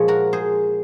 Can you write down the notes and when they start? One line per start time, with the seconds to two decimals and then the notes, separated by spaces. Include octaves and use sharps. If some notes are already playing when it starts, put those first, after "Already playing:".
Already playing: A#2 F3 G#3 C#5
0.08 F#4 A#4
0.33 G#4 C5